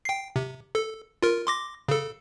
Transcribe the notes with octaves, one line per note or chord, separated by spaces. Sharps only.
G5 C7
C3
A4
F4 A#4
C6 D6 A#6
C#3 A4